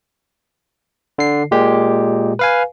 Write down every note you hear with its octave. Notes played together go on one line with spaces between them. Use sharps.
D3 C7
A#2 G#3 G4
B4 F5 G#5